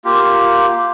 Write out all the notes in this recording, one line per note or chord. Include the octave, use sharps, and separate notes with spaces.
A#3 F4 G4